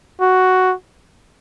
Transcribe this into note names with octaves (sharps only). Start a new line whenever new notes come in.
F#4